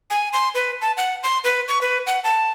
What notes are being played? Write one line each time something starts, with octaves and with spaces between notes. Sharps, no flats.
G#5
C6
B4
A5
F#5
C6
B4
C#6
B4
F#5
A5